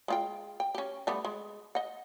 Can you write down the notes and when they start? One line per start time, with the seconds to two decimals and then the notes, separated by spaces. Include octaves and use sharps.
0.08 G#3 F4 G5
0.60 G5
0.75 C#4 G4
1.07 G3 A3 B3
1.25 G#3
1.75 D#5 F#5